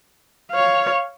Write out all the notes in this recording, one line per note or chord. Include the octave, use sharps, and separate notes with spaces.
C#5 F5